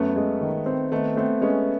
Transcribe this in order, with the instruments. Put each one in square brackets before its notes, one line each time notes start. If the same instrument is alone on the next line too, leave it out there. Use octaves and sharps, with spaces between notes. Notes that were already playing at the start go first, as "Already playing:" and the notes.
Already playing: [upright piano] F#2 [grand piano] A3 B3
[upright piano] G#3
D#3
C4
[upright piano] D#3 [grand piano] A3 B3
[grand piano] A3 B3 [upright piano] C4
[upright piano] G#3 [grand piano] B3 C#4